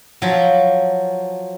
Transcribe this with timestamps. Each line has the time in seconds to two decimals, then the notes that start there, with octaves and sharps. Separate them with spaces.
0.22 F3 F#3